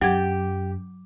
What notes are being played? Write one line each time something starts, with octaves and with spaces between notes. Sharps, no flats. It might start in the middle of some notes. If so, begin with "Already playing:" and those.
F#2 F#3 G4 F#5 G#6